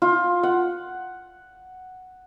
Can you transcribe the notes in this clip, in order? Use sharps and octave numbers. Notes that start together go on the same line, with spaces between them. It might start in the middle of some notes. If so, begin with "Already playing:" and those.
F4
F#5